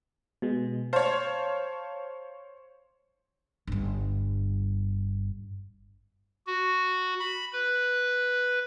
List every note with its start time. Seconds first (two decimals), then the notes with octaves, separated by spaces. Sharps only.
0.42 B2 G#3
0.93 C5 C#5 F5 A5
3.67 G1 G2
6.46 F#4
7.20 B5
7.53 B4